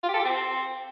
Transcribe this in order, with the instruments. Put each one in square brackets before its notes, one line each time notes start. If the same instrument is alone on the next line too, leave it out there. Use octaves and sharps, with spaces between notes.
[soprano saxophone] F4
G4
A4
G4
C4